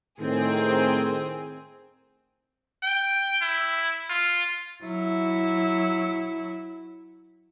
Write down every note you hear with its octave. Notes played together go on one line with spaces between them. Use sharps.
A2 D#3 C4 G#4
G5
E4
F4
F#3 E4